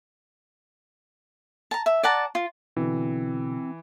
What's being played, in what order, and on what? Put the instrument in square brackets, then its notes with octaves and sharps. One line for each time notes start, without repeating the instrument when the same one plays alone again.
[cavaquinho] A5 A#5
E5
D5 F#5 A5 A#5
F4
[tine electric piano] B2 D3 [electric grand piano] E3 [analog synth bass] C4